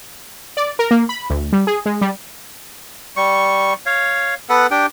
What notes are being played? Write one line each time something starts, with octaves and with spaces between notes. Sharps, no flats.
D5
A#4
A#3
B5
D2
G3
G#4
G#3
G3
G3 C#6
C#5 F5
B3 A4 B4 F#5
D4 G4 G5